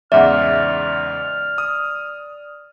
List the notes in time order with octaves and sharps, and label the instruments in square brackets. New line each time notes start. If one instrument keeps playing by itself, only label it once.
[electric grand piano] E2 G#2 C#3 [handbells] D5 [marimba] E5 F#5 [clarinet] F6
[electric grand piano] D#6